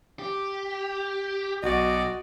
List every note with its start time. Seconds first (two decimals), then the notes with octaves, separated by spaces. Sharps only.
0.19 G4
1.62 B1 F#4 D5 D#5